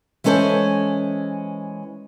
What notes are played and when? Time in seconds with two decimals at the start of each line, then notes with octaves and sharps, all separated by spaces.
0.24 E3 G#3 C#4 A4 C5 G#5